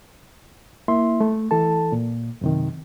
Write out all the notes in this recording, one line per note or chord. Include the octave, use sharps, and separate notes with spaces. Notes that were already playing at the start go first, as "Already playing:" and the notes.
A#3 E4 E5 C6
A3
E3 A4 A5
A#2
F#2 C3 D#3